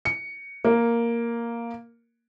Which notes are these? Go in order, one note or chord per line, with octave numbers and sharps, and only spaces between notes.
C#7
A#3